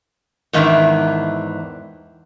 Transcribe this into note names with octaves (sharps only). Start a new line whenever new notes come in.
E2 G#2 D#3 E3 D4 E5